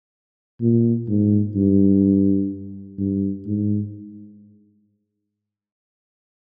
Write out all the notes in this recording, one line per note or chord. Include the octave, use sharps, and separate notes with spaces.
A#2
G#2
G2
G2
G#2